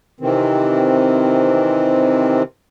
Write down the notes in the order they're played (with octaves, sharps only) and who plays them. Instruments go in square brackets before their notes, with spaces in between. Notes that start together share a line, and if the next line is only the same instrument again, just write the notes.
[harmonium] C3 D#3 E3 C4